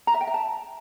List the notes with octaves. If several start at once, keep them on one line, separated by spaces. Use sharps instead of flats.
A#5
E5
G5
E5
A5